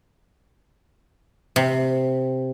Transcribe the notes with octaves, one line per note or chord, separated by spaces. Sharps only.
C3